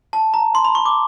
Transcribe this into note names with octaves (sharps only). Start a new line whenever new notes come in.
A5
A#5
C6
B5
C#6
D6